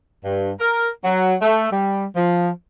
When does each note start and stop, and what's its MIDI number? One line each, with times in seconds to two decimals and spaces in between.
0.24 0.52 43
0.60 0.89 70
1.04 1.34 54
1.42 1.71 57
1.72 2.05 55
2.16 2.50 53